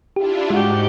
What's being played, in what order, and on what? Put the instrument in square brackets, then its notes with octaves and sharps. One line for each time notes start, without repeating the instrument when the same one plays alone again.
[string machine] D4 E4 F4 [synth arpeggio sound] G4
[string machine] G#2 [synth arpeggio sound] G#3 [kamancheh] F#4 G4